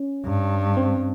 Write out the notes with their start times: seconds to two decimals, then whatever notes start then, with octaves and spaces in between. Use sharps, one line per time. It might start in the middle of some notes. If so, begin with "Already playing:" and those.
Already playing: C#4
0.25 G2
0.77 C4